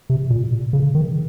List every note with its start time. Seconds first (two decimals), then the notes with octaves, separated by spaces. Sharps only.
0.10 C3
0.30 A#2
0.73 C#3
0.95 D#3